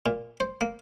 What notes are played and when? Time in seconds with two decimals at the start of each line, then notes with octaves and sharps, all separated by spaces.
0.06 A#2
0.40 C5
0.61 A#3